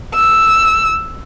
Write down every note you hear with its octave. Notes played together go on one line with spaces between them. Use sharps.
E6